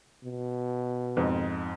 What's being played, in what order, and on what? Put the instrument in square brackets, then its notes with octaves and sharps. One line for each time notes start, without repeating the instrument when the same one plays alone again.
[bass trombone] B2
[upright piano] F2 G#2